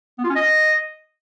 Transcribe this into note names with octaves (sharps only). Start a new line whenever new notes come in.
B3
F4
C#4
D#5